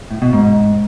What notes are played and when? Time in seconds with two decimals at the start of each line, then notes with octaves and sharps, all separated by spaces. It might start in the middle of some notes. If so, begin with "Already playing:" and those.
0.11 A2
0.22 B2
0.33 G#2